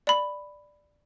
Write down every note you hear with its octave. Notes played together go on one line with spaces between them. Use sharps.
D5 B5